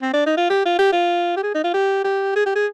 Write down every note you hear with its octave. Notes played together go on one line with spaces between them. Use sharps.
C4
D4
D#4
F4
G4
F4
G4
F4
G4
G#4
D#4
F4
G4
G4
G#4
G4
G#4